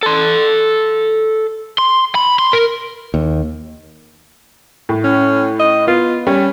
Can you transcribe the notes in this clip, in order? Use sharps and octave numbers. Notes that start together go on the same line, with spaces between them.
A4 C6
C6
B5
C6
A#4
D#2
A2
C#4
D#5
B3 F4
G3 C#4